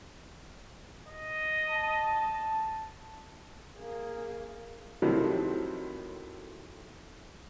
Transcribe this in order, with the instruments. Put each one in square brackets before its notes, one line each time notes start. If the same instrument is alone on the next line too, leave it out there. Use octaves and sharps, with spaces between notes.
[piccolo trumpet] D#5
[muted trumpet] A5
[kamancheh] A#3 G#4
[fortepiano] F2 A2 C3 D#3 F3 F#3